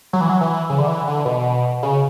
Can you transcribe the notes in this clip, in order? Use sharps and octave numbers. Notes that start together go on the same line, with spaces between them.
F#3
E3
F#3
E3
C#3
D3
E3
D3
B2
C#3